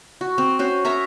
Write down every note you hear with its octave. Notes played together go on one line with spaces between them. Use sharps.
F#4
C4
C#4 F#4 C5
A#4 C#5 E5 A#5